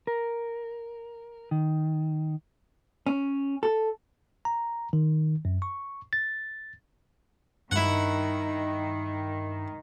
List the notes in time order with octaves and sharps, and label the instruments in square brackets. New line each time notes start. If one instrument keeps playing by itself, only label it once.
[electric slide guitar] A#4
D#3
[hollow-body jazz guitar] C#4
A4
[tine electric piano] A#5
D#3
F#2
C#6
A6
[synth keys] G2 [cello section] D#3 [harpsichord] E4 F#5